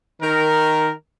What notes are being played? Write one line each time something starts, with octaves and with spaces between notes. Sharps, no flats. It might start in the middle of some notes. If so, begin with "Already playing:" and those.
D#3 A#4